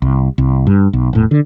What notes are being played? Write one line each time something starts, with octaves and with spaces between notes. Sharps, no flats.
C2
C2
G2
B1
E1 A2
D3